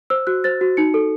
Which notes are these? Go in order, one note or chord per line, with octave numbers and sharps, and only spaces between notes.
C5 E6
F#4 F#6
C5 A6
F#4
D#4 C#7
A4